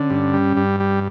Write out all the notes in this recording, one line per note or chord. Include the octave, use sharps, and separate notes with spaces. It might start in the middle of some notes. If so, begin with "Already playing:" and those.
Already playing: D3 C#4
G2
G3
G2
G3